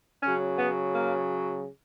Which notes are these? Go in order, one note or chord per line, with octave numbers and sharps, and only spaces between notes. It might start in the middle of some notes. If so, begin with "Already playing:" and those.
C#3 F#3 C#4
B3
A#3